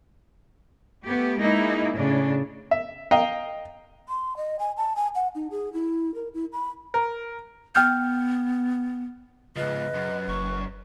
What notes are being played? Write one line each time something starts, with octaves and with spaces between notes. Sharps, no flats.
A3 B3 G4
G#3 A#3 D#4 E4
A2 C#3 D4
E5
D#5 F5 G5 A#5
C6
D#5
G#5
A5
G#5
F#5
D#4
G#4
E4
A#4
E4
B5
A#4
B3 G5 F6 G6
G#2 C#3 F3 B4 D#5
F#2
F#1 C#6